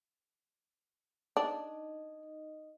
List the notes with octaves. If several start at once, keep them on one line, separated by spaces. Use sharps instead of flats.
D4 D#4 D#5